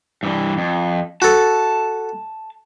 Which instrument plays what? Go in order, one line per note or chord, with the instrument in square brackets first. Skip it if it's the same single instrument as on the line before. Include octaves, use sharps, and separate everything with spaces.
[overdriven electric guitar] G2 E3
F2
[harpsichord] F#4 A4 [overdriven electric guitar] A5